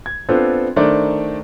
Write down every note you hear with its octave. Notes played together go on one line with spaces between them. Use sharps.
G#6
B3 C4 D4 F4 A4 C5
D#3 A3 D4 A#4 C5 D5